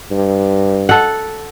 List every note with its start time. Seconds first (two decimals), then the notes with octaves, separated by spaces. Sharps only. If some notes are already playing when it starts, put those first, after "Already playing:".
0.11 G2
0.89 A4 F#5